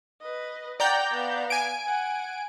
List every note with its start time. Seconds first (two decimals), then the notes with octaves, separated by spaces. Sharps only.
0.21 B4 D#5
0.80 D5 F#5 G5 A#5 G6
1.11 B3 F5
1.50 G#5 D7
1.87 F#5